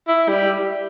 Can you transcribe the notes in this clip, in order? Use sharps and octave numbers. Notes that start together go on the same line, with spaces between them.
E4
G3